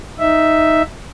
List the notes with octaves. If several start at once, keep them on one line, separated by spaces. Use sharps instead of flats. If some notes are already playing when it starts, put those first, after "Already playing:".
D#4 E5